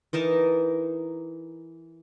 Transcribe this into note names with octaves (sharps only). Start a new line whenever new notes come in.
E3 D#4 A#4 A5